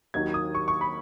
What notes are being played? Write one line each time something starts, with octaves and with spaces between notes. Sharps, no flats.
D#2 D#3 F#3 D#4 G#6
D#6
C#6
C#6
B5